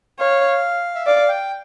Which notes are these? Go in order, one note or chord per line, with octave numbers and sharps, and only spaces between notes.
C#5 F5
E5
D5 F5
G5